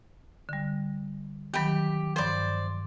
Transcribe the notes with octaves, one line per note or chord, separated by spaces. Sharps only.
D3 G3
D#3 F#3 G4 B5
G2 F3 C5 D5